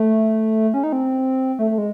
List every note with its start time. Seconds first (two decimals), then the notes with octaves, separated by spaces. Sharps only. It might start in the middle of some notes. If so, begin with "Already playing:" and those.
Already playing: A3
0.74 C#4
0.84 D#4
0.93 C4
1.59 A3
1.71 A3
1.78 G#3